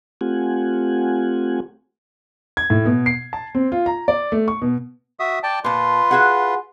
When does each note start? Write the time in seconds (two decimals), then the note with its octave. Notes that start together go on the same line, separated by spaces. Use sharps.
0.21 A3 C4 F4 G4 F#5 G#5
2.57 G#6
2.70 A2
2.85 B2
3.06 C7
3.33 A5
3.55 C4
3.72 F4
3.86 A#5
4.08 D5
4.32 A3
4.48 C#6
4.62 B2
5.20 F#4 E5 D#6
5.43 D5 G5 A5
5.64 A#2 F4 B4 A5 C6
6.11 F#4 G#4 F#5